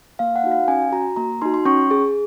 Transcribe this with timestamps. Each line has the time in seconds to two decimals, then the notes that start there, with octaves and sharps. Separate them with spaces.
0.19 A#3 F5
0.36 F#5
0.44 D#4 F#4
0.51 F5
0.68 C#4 G#5
0.92 F#4 A#5
1.16 A#3 A#5
1.42 D#4 F#4 C6
1.54 C6
1.65 C#4 C#6
1.91 G#4